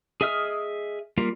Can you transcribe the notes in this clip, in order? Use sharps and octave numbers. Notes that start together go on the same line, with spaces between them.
G#4 D#5 E5 D#6 F6
G3 A#3 F4